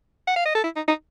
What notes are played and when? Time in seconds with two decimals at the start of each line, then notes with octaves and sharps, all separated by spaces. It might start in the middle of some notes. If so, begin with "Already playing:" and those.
0.27 F#5
0.36 F5
0.46 D#5
0.55 A4
0.64 E4
0.76 D#4
0.88 D#4